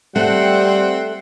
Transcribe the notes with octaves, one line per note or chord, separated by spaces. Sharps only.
G3 A3 C4 F#5